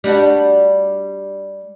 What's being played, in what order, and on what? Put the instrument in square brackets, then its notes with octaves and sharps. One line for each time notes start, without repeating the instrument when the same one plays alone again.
[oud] G3 D4 F#4